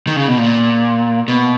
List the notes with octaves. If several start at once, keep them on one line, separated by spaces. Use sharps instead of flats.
D#3
C#3
B2
A#2
B2